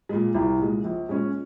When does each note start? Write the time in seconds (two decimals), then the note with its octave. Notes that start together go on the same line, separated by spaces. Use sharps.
0.09 A#2 G#3
0.34 C2
0.59 A#2 G#3
0.84 A#1
1.09 A#2 G#3 C#4